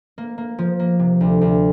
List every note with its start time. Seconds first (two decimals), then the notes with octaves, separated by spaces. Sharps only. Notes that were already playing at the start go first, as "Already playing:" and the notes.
0.18 A#3
0.38 A#3
0.59 F3
0.80 A#3
0.99 C3
1.21 D2
1.41 D2